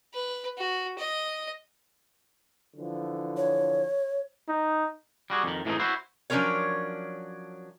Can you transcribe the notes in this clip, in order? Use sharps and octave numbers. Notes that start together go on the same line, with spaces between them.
B4
F#4
D#5
D3 E3 F3
C#5
D#4
G3 F#4 G#4
F2 D#3
A2 E3 G3 G#3 C4 D#4
E4 F#4 C5
F3 F#3 C#4 D4 A#4 C#5